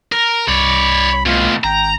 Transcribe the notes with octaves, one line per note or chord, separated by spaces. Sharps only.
A#4
C2 C#5 D5 B5
B2 A3 F4
G#1 G5 A#5